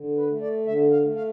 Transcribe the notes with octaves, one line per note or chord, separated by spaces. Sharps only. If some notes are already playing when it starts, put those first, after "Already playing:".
Already playing: D3
B4
A3
D5
D3 E5
F5
A3
F5